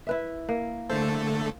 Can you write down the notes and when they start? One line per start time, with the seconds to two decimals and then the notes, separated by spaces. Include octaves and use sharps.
0.07 E4 B4 E5
0.49 A#3
0.89 D3 A3 A4 C5